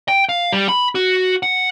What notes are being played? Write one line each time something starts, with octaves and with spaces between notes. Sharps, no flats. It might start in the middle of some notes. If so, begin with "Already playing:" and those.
G5
F5
G3
B5
F#4
F#5